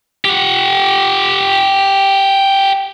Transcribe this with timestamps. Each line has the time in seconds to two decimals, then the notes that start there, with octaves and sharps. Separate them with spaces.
0.25 G4 F#5